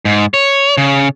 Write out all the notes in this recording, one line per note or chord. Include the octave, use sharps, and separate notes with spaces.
G#2
C#5
C#3